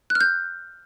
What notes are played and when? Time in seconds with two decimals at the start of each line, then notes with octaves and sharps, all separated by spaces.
0.10 F#6
0.15 F6
0.21 G6